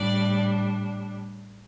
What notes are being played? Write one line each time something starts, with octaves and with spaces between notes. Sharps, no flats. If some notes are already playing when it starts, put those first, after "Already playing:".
Already playing: A2 G3 D4 D5